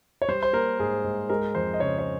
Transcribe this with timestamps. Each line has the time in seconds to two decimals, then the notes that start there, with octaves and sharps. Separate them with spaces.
0.22 C#5
0.28 G3 C5
0.43 C5
0.53 A#3 A#4
0.80 G#2 G#4
1.04 G#2
1.30 G#3 A#4
1.55 F2 C5
1.73 D#5
1.80 C#3 C#5
1.99 C#5